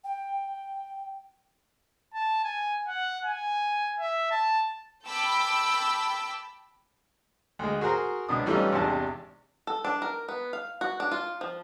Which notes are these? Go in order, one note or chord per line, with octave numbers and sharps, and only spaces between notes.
G5
A5
G#5
F#5
G#5
E5
A5
G5 A5 B5 D6 E6
D2 G#3
F#4 G#4 A#4 C5 A#5
C#2 B2 D4 D#6
E3 G3 A3 C#4 D#4 F4
G#1 E2 C3 D4 G4 A5
A4
D4
A#4
B3
F5
F#4
D4
F4
F3